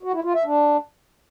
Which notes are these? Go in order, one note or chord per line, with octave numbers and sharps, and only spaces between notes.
F#4
E4
F4
E5
D4